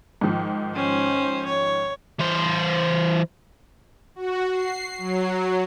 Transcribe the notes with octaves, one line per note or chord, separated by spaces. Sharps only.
G#2 D#3 F3
C#4 C5
C#5
E3 C5
F#4
C7
F#3